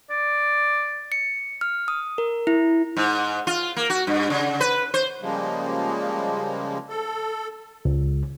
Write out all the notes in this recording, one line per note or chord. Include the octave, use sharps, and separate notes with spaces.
D5
C#7
F6
D#6
A#4
E4
G#2
F4
A#3
F#4
G2
C#3
B4
C5
C#3 F3 G3 G#3 A#3
A4
C#2